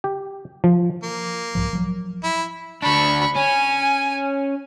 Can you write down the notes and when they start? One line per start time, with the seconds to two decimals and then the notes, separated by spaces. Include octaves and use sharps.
0.04 G4
0.64 F3
1.03 A#3
1.55 C2 G#2 F3
1.73 F3 F#3
2.23 E4
2.82 D2 D4 B5 C#6
3.35 C#4 G#5